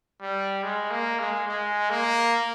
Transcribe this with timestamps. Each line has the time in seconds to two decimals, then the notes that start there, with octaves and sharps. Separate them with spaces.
0.21 G3
0.63 G#3
0.91 A#3
1.20 G#3
1.48 G#3
1.90 A#3